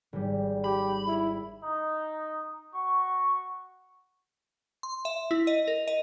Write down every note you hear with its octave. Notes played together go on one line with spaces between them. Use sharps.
G#1 G3
G4 B5
E4
D#4
F#4 C#6
C6
E5
E4
D#5
A#4
D#5